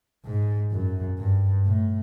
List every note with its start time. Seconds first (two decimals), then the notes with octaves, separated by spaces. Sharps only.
0.25 G#2
0.71 F#2
1.18 G2
1.65 A2